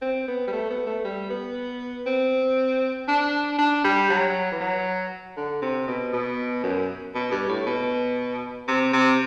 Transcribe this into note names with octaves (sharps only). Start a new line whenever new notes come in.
C4
B3
G3
A3
B3
A3
G3
B3
C4
D4
D4
G3
F#3
E3
F#3
D3
C3
B2
B2
F#2
B2
G2
A2
B2
C3
C3